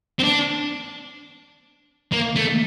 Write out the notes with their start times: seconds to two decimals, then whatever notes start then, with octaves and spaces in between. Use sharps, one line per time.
0.19 C4
0.24 D4
2.12 A#3
2.36 A3